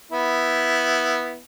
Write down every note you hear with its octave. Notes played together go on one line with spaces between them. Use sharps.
B3 E4